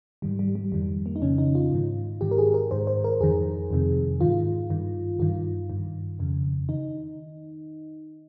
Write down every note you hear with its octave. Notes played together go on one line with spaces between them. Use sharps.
G#2 D#3 G3
G3
G3
F2 D#3 G3
A#3
D#4
F2 C#3 C#4
D#4
F4
G#2 D#3
G#2 D#3 G4
A#4
G#4
A#4
G#2 D#3 C5
C5
A#4
F2 D#3 G#4
F2 C3 D#3
G#2 D#3 F4
G2 D#3
G2 D#3 F4
G2 D#3
F2 C#3
D#3 D#4